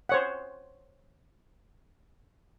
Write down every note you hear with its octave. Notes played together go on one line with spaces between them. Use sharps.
C5 C#5 F#5